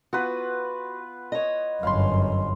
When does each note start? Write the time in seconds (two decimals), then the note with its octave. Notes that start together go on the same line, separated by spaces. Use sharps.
0.13 B3 F4 F#4 B4
1.32 C#5 D#5
1.83 G1 F#2 F5 B5 C6